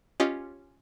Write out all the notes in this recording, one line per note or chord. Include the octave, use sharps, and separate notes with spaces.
C#4 F4 G4 D#5